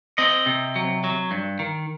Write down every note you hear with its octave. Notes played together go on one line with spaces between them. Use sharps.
C4 D#5
C3
F#3
F#3
G2
D#3